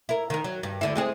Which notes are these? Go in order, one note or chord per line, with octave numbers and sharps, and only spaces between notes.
E4 A#4
D#3 A#4
F#3
G2
D2 D3 E4
G#3 C4 G#4